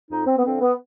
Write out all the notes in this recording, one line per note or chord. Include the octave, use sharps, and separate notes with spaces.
F2 D#4
C4
B3
D3 F3 C4
B3